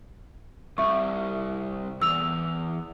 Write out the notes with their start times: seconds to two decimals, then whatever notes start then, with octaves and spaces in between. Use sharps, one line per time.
0.78 C2 E5 C#6
2.02 E2 E6 F7